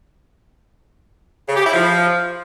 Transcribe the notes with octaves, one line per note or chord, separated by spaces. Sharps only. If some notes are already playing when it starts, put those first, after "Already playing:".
C#3
G4
E4
F3